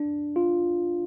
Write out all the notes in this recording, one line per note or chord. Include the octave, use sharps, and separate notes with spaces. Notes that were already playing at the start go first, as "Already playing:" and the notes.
Already playing: D4
F4